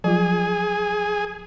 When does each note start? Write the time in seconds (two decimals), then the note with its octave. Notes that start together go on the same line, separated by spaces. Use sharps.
0.04 F3 F#3 F4 G#4